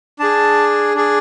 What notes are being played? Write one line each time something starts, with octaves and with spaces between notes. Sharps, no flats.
D4 G#4 A5
D4 G#4